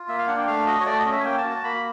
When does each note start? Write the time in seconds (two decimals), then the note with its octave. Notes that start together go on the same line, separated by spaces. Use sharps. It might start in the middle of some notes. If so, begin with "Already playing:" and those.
Already playing: F4
0.08 A#3 E5
0.18 F5
0.27 D4 F#5
0.37 G5
0.47 A3 F5
0.66 F#4 D#5
0.80 C#5
0.86 A3 D5
0.99 D#5
1.05 C#4
1.12 E5
1.20 G#5
1.25 A#3 G5
1.38 A5
1.44 F#4
1.51 A5
1.64 A#3 B5